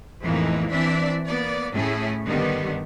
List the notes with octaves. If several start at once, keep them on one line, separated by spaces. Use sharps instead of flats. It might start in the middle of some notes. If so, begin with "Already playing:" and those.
F2 A2 E3 G#3 A#3 D#4
E3 C4 D4 D5 E5
A#3 B3 D5
A2 A3 C#4 E4 G#4
G2 D3 D#3 G3 B3